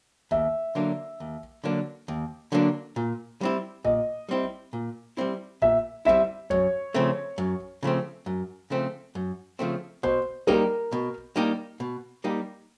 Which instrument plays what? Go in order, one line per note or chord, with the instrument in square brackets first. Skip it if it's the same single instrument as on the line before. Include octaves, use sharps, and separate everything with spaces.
[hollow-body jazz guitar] D#2 [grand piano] E5
[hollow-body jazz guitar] D3 F#3 A#3 D4
D#2
D3 F#3 A#3 D4
D#2
D3 F#3 A#3 D4
A#2
G3 C4 E4
[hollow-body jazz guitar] A#2 [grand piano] D#5
[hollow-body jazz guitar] G3 C4 E4
A#2
G3 C4 E4
[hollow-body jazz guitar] A#2 [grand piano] E5
[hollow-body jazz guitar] G3 C4 E4 [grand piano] E5
[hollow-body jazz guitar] F#2 [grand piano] C#5
[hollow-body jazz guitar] C#3 F3 A3 C4
F#2
C#3 F3 A3 C4
F#2
C#3 F3 A3 C4
F#2
C#3 F3 A3 C4
[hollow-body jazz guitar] B2 [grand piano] C5
[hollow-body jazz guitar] G3 A#3 D#4 G4 [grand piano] A#4
[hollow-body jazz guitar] B2
G3 A#3 D#4 G4
B2
G3 A#3 D#4 G4